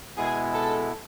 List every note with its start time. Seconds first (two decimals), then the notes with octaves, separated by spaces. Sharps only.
0.17 B2 G#3 B3 E4 G#4
0.54 A4